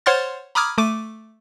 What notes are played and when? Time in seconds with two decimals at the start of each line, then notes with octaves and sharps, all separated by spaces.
0.06 C5 C#5 F#5 C6 F6 A6
0.55 A#5 B5 D6 D#6 F6 G#6
0.78 A3 D6 D#7